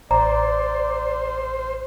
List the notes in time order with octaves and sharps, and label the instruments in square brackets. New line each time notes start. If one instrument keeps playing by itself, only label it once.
[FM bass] A1 [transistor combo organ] C5 [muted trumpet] D5 [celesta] A#5